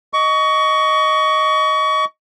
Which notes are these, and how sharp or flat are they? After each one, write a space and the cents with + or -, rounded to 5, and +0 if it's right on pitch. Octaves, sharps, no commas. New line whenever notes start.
D#5 +0 C#6 +25